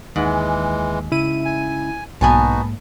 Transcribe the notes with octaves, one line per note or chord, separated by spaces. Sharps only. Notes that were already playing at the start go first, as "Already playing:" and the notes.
D#2 G#2 E3 G#3
C#3 E4 D#7
G#5
B1 G#2 A#3 B3 D#4 F#4 G#5 A5